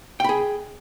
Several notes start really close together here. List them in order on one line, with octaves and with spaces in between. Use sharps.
G5 B5 G#4